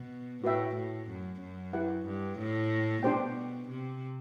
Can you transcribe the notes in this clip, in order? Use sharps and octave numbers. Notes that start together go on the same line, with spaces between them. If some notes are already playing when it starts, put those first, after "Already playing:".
Already playing: B2
A2 F#4 B4 E5 G5
A2
F#2
F#2
E4 G4 B4 F#5
G2
A2
B2 D4 G4 C5 G5
C3